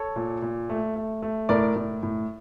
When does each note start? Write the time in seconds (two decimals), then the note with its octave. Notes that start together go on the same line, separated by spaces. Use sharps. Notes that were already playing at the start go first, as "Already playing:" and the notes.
Already playing: A4 C#5
0.16 A#2
0.42 A#2
0.69 A3
0.96 A3
1.22 A3
1.49 A2 A#4 D5
1.76 A2
2.03 A2